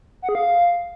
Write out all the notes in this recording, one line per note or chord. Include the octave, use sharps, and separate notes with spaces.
F#5
G#4
F5